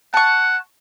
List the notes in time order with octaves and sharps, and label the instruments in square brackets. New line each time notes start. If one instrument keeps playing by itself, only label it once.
[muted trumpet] F#5 [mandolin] A5 C#6